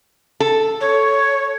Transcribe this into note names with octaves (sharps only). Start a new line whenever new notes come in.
A4
C#5